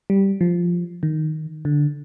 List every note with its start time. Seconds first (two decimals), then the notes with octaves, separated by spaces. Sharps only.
0.10 G3
0.41 F3
1.03 D#3
1.65 D3